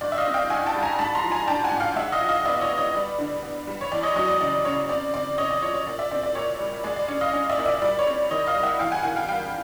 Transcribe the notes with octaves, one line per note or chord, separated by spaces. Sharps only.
G2 D5
E5
D#5 F5
C4
F5 G5
G2 F#5 G#5
G5 A5
G3
G#5 A#5
G#2 A5 B5
A#5 C6
F3
G#5 A#5
D4 G5 A5
F#5 G#5
G#2
F5 G5
G#3 E5 F#5
D#5 F5
F3
D#5 F5
B3 D5 E5
C#5 D#5
B3
C#5 D#5
G3 D5
D3
B3
G3
C#5
E2 D5
C#5 D#5
F#3 C#5 D#5
D5
C#3 D5
C#3 C#5
C4 D5
C4 D5
C4 C#5 D#5
D5
F3 C#5
C#5
A#2 D5
D5 E5
C4 D5
D5
A#2 C#5
G3
G#3 D5
D5
C#4
D#5 F5
C#4
D5 E5
A#2
D5 E5
G3 D5
C#5
C4
D#3 C#5 D#5
D#5 F5
G3
E5 F#5
E2 F5 G5
F#5 G#5
D#3 F#5 G#5
F5 G5
G3 F5 G5